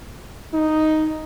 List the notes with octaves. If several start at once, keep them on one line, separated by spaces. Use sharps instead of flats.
D#4